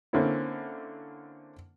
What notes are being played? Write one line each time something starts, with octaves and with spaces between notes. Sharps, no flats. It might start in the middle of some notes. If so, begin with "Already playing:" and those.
D3 A#3 C4 C#4 E4